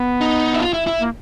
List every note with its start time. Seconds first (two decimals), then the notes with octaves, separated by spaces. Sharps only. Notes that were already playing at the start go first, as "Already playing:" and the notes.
Already playing: B3
0.21 D#4
0.54 E4
0.60 F4
0.73 E4
0.87 E4
1.00 A#3